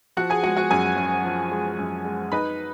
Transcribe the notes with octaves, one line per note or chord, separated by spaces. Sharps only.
F3 F#4 F#5
G#4 G#5
G#3 F#4 F#5
F#4 F#5
F#2 G#4 G#5
F#2
F3
G#3
F#2
G#3
D#4 B4 B5